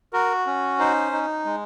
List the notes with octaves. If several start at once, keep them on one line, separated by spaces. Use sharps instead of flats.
F#4 A#4
C#4
D#4 C5
D#4
G#3